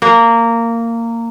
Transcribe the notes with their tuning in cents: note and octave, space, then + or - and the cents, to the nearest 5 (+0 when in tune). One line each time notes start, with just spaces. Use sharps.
A#3 -15